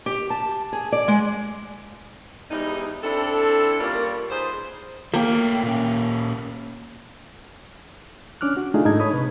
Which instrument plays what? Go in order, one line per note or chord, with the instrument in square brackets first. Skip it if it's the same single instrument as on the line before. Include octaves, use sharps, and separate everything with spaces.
[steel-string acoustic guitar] G4
A5
G#4
D5
G#3
[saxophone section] E2 G#2 G3 D#4
C4 D4 E4 A4
G3 A#3 C#4 F4 A#4 D5
D#4 F4 G#4 B4 C5
[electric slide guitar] A3 G5 [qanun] A#3
[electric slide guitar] A#2 C#4
[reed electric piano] C#4 D4 D6 F6 F#6
F#4
A3 D4 D#4 F4 G#4
G#2 D#4 A4 G#6
C#5 B5 D#6
C3 B4